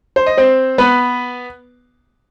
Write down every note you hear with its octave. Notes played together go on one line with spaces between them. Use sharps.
C5
D#5
C4 C5
B3 B4